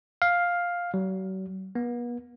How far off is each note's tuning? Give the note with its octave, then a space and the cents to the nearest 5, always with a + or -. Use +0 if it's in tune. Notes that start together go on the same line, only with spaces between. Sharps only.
F5 +5
F#3 +40
B3 -40